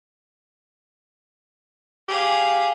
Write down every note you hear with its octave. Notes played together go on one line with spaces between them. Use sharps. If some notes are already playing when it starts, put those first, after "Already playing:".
G4 G#4 F5